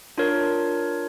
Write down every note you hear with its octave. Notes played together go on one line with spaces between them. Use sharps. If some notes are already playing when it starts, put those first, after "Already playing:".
D4 F4 A#4 C#5